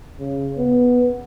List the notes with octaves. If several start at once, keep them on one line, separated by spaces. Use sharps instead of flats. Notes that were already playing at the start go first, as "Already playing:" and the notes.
C#3
B3